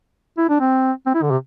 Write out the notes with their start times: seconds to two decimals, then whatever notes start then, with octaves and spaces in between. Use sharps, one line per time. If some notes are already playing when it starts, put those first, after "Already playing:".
0.38 E4
0.49 D4
0.60 C4
1.06 C4
1.15 E4
1.23 D3
1.31 C3